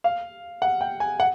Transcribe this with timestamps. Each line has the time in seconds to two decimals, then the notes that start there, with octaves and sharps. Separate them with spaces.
0.04 F5
0.62 F#5
0.81 G5
1.00 G#5
1.20 F#5